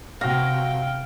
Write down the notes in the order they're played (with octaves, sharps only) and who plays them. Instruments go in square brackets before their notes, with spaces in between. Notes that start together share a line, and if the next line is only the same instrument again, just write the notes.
[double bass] C3 [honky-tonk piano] F#4 A#6 [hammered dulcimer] F5 [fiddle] G5